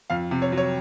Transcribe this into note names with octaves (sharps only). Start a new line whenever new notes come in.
F2 F5
C3
C#5
F#3
C#5